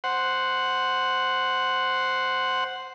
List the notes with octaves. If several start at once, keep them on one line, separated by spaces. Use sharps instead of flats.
C5 F#5